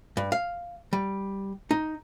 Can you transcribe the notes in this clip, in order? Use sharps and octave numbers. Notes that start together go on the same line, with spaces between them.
G2
F5
G3
D#4